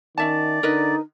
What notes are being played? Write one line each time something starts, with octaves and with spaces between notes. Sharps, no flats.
D#3 C#4 D5 E5 A5
D3 D#4 A#4 B4 D#5